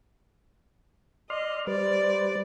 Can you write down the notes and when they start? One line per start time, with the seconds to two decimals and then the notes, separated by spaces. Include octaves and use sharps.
1.30 D5 D#5 C6 F6
1.67 G3 B4 C5 D5